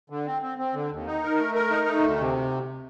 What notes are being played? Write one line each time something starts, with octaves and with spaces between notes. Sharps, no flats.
D3
C4
C4
C4
D3
D#2
D#4
A#4
A3
A#4
D#4
A3
D2
C3